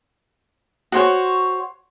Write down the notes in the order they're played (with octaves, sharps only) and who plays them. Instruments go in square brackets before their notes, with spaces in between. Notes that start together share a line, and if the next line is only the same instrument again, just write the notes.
[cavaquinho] F#4 C5 C#5